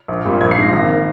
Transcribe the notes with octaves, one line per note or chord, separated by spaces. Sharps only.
A#1
A#2 G3
A#1 G#6
C7
G#2 F3 A#6
G#1 A#6
D#3